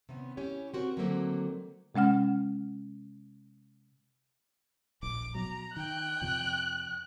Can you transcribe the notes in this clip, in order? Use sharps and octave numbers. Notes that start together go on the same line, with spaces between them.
C3 D#3 B3 C#4
C#4 E4 G4 C#5
C4 F#4 A#4
D3 D#3 F#3 A3 A#3 C4
C3 G#3 C#4 F#5 F6
D1 A#1 D6
B2 F#3 A#5
D#3 G5 F#6
F2 C3 F3